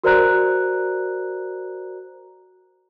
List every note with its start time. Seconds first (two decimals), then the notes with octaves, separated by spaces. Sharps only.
0.04 F#4 A#4 C5 D5 A#5 F#6